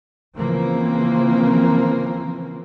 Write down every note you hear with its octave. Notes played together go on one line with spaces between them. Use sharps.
C#3 E3 F3 A#3 C4